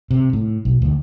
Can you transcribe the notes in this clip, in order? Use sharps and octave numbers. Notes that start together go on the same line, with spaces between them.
C3
A2
B1
D2